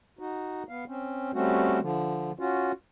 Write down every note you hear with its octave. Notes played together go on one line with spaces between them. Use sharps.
D#4 F#4
B3 F5
C4 C#4
G3 A3 C4 C#4 F#4
D3 F3
C#4 F4 F#4